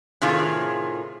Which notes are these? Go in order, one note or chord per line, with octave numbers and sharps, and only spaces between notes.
A2 C3 D#3 F4 G#4